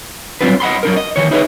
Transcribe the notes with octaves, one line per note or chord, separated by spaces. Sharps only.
F#3 G3 C4 D4 F4 B4
D#5 F#5 B5 C6
F#3 D4 A#4
D#5
D#3 E3 C#5
D#4 E4 G#4 B4 C#5 D#5